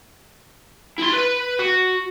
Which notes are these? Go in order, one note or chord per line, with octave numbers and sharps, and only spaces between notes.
E4 C6
B4
F#4